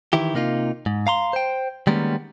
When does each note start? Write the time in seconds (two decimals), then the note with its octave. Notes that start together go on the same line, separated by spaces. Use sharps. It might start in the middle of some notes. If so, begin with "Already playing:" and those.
0.13 D#3 E3 E4 G4
0.35 C3 A#3 D#4 F4
0.86 G#2
1.07 F5 A#5 C6
1.33 C5 G5
1.87 D#3 G3 G#3 A#3 B3 C#4